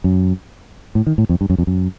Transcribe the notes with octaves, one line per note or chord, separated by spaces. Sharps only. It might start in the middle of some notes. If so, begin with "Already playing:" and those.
F#2
A2
D#3
A2
F2
G2
F#2
F2
F#2